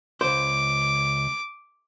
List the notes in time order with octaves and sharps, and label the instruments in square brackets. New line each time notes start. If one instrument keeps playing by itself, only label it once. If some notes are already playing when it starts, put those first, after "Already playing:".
[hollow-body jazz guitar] C#2 C5 [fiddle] D6